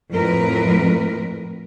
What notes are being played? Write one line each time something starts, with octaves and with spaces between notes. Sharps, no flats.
F2 A2 A#4 B4